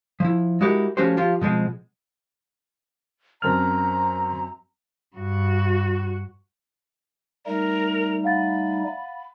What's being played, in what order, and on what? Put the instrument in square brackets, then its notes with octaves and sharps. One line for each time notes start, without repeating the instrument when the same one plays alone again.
[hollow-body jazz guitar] F3 E4
G#3 E4 F#4 G4 A#4
F3 A3 C#4 F#4 G4 C5
F3 F4 G4
B2 F3 G#3 C4
[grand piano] F#2 C4 F7 [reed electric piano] A#4 A5 F6 [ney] A#5
[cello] G2 F#4
[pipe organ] G3 A3 D#4 [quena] A#4
[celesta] F5 F#5 A6 [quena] B5